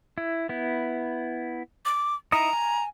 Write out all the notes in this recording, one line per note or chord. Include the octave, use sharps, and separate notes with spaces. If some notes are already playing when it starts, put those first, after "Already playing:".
E4
B3 E4
D6
D#4 E4 A#5 D#6
G#5